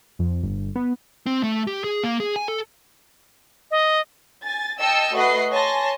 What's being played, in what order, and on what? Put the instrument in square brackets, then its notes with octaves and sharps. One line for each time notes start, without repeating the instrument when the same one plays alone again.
[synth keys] F2
G1
B3
[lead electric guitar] C4
A3
G4
G#4
A#3
G#4
G#5
A4
[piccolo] D#5
[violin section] G#5 A6
D#5 G5 A5 E6 C#7
A3 F#4 B4 D#5 F#5 C7
C#5 G#5 A5 C6 A#6